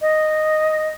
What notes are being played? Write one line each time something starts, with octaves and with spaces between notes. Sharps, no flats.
D#5